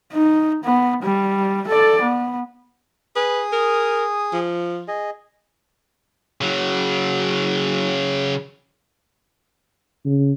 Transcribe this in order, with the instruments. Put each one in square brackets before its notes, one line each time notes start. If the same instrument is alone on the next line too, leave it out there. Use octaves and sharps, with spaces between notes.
[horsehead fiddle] D#4
B3
G3
A4 D5
B3
[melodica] G#4 D#6 [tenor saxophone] B4
[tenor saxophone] A#4
F3
[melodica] G#4 D#5
[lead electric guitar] C#3 F#3
[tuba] C#3